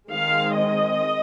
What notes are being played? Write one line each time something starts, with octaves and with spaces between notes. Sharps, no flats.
D#3 G#3 C4 F5
D#5